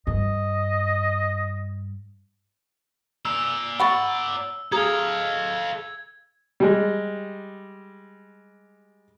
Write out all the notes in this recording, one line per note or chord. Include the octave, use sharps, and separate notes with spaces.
G2 D#5
D5 A#5 E6
F#5 B5 C#6 A6
G#4 A4 F5 A#5 G#6
G3 G#3